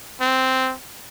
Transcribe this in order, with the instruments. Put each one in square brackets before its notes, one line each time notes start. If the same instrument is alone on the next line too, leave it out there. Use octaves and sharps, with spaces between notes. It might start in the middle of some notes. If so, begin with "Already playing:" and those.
[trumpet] C4